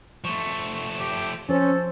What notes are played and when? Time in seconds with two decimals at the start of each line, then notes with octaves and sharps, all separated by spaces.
0.24 F3 A3 C#6
1.00 G4
1.49 F3 C#4 A4 C5